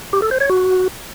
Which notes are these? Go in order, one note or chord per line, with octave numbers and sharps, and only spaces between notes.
G4
A4
C5
C#5
F#4